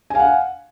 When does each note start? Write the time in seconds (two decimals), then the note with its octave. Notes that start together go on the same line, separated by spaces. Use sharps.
0.10 G#5
0.15 F5
0.19 F#5